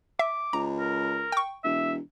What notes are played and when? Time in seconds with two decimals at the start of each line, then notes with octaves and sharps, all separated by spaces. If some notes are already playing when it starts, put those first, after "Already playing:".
0.19 E5 D6
0.53 C#2 A#5
0.79 A#4
1.32 G5 C#6
1.64 E1 E5